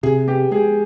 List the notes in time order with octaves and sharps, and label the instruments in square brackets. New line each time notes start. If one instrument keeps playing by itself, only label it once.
[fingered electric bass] C3 [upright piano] G#4
[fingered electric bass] B3 [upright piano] G4
[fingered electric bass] G#3 [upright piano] G#4